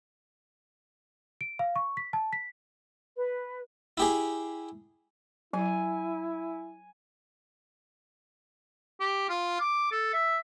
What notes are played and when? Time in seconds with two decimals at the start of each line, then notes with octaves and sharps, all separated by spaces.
1.41 D7
1.59 F5
1.76 C#6
1.97 B6
2.13 A5
2.33 B6
3.16 B4
3.98 E4 G4 G#4
5.53 F#3 E4 G#5
9.00 G4
9.29 F4
9.61 D6
9.92 A4
10.13 E5